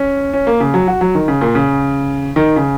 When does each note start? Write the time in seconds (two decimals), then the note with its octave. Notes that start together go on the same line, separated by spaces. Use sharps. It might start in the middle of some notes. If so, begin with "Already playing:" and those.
Already playing: C#4
0.34 C#4
0.47 A#3
0.60 C#3
0.74 F#3
0.88 F#4
1.01 F#3
1.15 D#3
1.28 C#3
1.41 A#2
1.55 C#3
2.36 D#3
2.56 C#3